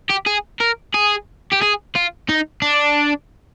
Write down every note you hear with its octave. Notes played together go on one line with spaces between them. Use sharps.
G4
G#4
A#4
G#4
G4
G#4
F4
D#4
D4